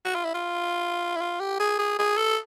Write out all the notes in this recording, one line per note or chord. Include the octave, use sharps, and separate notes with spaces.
F#4
F4
E4
F4
E4
F4
G4
G#4
G#4
G#4
A4